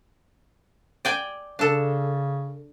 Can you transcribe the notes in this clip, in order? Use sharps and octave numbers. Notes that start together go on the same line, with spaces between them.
D5 G5 G#5
C#3 D4 A4